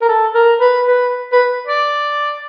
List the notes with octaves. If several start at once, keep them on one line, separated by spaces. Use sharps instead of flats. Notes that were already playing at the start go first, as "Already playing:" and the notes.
A#4
A4
A#4
B4
B4
B4
D5